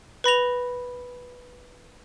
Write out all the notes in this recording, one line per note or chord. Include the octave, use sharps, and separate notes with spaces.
B4 B5 A#6 F7